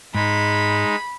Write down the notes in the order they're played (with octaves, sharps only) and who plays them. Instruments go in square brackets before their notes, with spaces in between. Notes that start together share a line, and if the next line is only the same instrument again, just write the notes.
[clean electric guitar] G#2 [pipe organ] G#3 D#4 [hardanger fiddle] B5